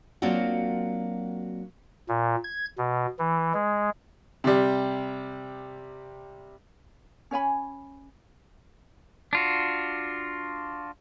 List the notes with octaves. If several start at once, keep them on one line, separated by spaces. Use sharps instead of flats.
F#3 A#3 C4 D4 F4 F#4
A#2
G#6
B2
E3
G#3
C3 G3
C#4 C#5 G#5 B5
D4 F4 F#4